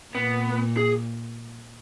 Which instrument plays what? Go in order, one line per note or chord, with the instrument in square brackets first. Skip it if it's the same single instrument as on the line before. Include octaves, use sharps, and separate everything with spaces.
[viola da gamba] A#2 [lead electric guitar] B3
[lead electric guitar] G#4